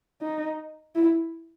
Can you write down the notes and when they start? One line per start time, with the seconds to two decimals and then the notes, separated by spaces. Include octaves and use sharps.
0.21 D#4
0.96 E4